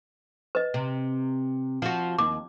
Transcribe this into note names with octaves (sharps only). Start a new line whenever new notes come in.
B4 D#5
C3
F3 F#4
D#2 D6